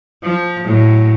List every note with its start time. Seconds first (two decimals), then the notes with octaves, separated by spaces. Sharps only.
0.24 F3
0.66 A2 F#3